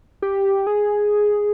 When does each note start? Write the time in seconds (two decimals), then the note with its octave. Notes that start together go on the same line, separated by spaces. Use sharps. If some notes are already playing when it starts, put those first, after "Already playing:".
0.22 G4
0.67 G#4